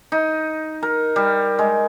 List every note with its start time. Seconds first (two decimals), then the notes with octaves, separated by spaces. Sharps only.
0.12 D#4
0.83 A#4
1.16 G3
1.59 G#3